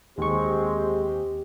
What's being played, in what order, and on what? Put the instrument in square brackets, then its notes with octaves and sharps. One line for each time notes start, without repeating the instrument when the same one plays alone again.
[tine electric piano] D#2 C#6 [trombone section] G#3 C4 [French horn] G4